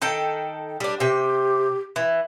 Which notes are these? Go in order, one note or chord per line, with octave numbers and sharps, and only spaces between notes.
D#3 A4 G5
G3 D4
C3 G4 G5
E3